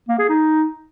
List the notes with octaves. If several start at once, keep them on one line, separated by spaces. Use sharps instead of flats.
A#3
G#4
D#4